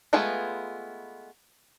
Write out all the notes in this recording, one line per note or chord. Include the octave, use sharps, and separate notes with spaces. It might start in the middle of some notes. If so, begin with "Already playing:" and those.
G#3 A3 B3 F4 G#4